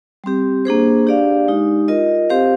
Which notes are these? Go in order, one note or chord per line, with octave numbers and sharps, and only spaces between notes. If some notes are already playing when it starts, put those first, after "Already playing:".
G3 C4 G4
A#3 D4 G#4 C5
D4 G4 D5 F5
G#3 D#4 G4
F4 A#4 D#5
C4 G4 C5 F5